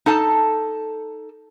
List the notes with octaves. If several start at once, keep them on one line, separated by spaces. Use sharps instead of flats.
D#4 A4 A5